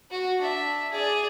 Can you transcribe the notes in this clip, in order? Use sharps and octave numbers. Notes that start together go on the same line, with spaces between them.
F#4
D4 E5
G#4 D5